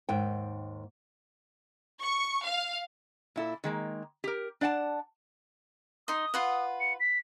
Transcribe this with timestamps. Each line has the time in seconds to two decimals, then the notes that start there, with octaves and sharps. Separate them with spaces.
0.09 D#2 G#2 G5
2.02 C#6
2.44 F5
3.36 A#2 E4 A4
3.64 D#3 G#3 A#3
4.24 G4 A#4
4.61 D4 D5 F#5 G5 A5
6.08 D#4 C6 D#6
6.34 F4 B4 F#5
6.81 C#7
7.00 B6